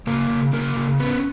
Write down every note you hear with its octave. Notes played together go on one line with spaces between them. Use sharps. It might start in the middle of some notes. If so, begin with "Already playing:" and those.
C#3 A#3 A#4
C#3
C#3 A#3 A#4
C#3
B3 C#4 B4